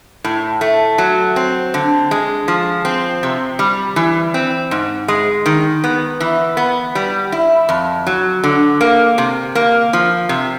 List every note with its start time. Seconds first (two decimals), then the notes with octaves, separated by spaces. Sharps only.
0.24 A2
0.61 A3
0.98 F#3
1.36 C4
1.74 D3
2.11 G#3
2.48 F3
2.85 C4
3.23 C3
3.59 G3
3.96 E3
4.34 C4
4.71 G#2
5.08 G#3
5.46 D#3
5.84 B3
6.20 E3
6.57 B3
6.95 G3
7.32 E4
7.69 F2
8.07 F#3
8.44 D3
8.81 A#3
9.18 C3
9.55 A#3
9.93 F3
10.29 C3